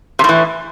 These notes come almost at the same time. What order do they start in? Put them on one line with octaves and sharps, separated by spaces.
C3 A2 E3